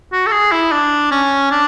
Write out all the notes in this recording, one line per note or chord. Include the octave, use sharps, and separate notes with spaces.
F#4
A4
G#4
E4
D4
C#4
D4